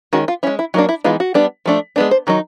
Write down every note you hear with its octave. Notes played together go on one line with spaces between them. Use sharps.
D#3 G#3 C#4 F#4
F4
G#3 C#4 E4
E4
F#3 A#3 D4 D#4
E4
E3 G#3 B3 D#4 F4
F#4
G3 B3 D4
F3 A3 D4
G#3 B3 D4
C5
D#3 F#3 D#4